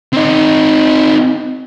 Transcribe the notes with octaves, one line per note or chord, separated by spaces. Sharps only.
C4 D#4